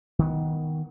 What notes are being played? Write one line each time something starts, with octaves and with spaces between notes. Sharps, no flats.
D#3 B3